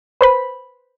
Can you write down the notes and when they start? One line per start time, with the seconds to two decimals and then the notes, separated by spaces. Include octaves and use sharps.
0.21 B4 C5 B5